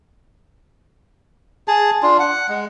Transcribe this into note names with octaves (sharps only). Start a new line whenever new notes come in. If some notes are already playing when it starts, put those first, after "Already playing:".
G#4 A5
D4 F4
F#5
G#3